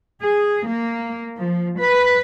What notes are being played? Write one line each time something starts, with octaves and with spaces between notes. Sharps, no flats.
G#4
A#3
F3
B4